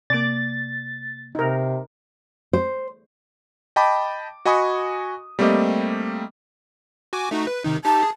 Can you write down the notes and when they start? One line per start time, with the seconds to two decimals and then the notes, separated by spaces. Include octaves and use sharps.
0.10 C3 A#3 D5 D6 A6
1.35 C3 D#4 A#4
2.53 C5
3.76 D#5 G5 A5 B5 D6
4.45 F#4 D#5 G#5 B5 C#6 D#6
5.39 G3 A3 A#3 C4 G4 D#5
7.13 F#4 G#5 D6
7.31 A3 D#4 F#4
7.47 B4
7.64 C3 D#3 D#4
7.85 D#4 G4 A5
8.02 G#4